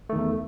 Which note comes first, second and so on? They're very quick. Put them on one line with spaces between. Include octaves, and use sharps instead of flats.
A3 D#3 E2